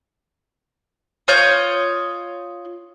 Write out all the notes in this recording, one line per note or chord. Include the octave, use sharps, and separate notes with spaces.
F4 C#5 D#5 G6